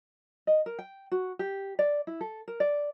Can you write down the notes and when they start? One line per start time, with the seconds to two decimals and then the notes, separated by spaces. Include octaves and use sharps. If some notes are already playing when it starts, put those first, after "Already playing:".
0.47 D#5
0.66 A#4
0.79 G5
1.12 F#4
1.39 G4
1.79 D5
2.07 E4
2.21 A4
2.48 A#4
2.60 D5